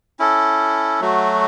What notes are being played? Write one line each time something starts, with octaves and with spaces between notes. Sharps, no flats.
C#4 E4 A4
F#3 A3 F#4